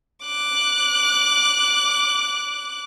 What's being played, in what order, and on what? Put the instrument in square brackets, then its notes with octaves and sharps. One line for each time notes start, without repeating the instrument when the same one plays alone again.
[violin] D6 F#6